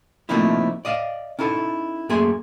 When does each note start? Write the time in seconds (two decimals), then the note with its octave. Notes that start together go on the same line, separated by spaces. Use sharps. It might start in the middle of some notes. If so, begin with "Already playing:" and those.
0.29 F3 A3 A#3 C4 D#4 E4
0.85 D5 D#5 F5
1.39 C#4 D#4 E4 A4
2.09 F#2 A3 A#3 G#4 G#5 C6